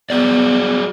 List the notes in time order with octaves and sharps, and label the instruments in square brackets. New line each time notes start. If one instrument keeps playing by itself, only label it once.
[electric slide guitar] F#3 G#4 D5 [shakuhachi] B3